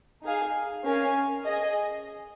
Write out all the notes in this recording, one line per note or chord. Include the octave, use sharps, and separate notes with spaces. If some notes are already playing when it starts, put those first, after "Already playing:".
D#4 G#4 F5 G#5
C#4 A#4 F5 G#5
G#4 D#5 G#5